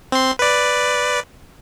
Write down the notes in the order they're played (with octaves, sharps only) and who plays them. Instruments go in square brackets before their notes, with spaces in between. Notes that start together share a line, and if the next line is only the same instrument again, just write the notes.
[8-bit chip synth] C4 C6
B4 D5